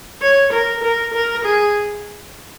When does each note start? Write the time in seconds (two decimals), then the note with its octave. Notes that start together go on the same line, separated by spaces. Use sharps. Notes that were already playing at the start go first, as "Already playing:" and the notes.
0.22 C#5
0.53 A#4
0.83 A#4
1.14 A#4
1.45 G#4